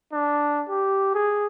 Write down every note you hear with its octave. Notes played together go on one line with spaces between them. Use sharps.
D4
G4
G#4